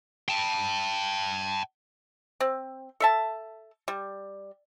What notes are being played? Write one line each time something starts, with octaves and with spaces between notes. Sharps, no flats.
G5 A5
C4
A4 E5 A5
G3